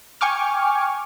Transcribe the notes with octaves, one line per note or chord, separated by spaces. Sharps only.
G5 G#5 C#6 D6 F6